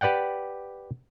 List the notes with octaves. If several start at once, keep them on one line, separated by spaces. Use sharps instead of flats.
G4 B4 D5 F#5 G5